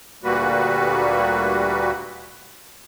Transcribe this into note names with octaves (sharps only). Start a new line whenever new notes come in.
D2 A#2 G3 A#3 F#4 B4